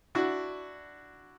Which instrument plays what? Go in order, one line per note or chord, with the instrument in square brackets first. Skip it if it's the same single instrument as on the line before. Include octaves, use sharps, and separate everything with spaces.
[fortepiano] D4 E4 F#4